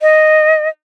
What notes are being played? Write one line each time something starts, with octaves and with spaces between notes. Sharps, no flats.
D#5